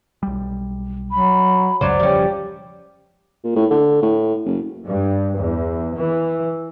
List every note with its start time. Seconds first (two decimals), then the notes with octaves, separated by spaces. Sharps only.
0.23 B1 G3
1.11 F#3 B5
1.81 C#2 F#2 C#3 F#3 C5 D5
2.00 E1 C#3 F3 G3 C#4 G4
3.44 A#2
3.56 A2
3.71 D3
4.02 A2
4.45 F#1
4.85 G2
5.37 E2
5.94 E3